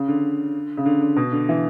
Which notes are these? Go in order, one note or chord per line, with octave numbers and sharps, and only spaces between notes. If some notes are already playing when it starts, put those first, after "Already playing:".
Already playing: C#3
D3
C#3
D3
D3
B2
D3
E3